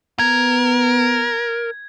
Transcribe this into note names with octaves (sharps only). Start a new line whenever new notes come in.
B3 A#4 G#6